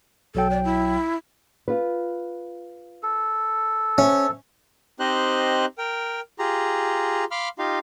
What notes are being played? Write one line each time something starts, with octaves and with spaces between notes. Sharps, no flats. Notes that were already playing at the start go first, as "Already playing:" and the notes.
B1 F#3 A4 G5
D5
E4
F4 B4
A4
C#4 C5 E5
C4 D#4 G4 C5 D#5 F#6
A#4 G5
F4 G4 G#4 A#5
F5 B5 C6 D6 F6
D#4 F4 G4 F5